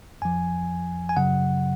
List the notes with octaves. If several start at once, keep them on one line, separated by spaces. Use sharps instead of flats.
F2 F3 G#5
G#5
F#2 C#3 F#3 F#5